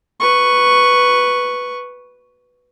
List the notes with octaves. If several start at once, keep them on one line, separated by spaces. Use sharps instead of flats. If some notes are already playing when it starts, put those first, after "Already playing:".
B4 C#6